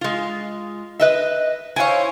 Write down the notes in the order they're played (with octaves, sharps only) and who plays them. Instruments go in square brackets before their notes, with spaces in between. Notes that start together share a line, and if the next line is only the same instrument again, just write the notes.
[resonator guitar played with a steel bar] G#3 F4
B4 D#5 E5
[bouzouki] E4 C5 C#5 [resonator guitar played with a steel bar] F5 G#5